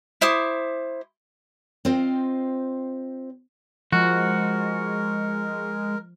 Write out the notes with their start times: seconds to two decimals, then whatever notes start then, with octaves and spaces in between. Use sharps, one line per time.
0.21 E4 C5 D6 D#6
1.85 C4 F4 C5 D#5 F5 G5
3.93 F3 G#3 F#4 A#4